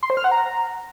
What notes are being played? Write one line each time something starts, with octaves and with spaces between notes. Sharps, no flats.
C6
C5
F6
F#5
A#5